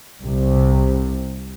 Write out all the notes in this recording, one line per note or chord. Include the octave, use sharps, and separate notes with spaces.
C2 C3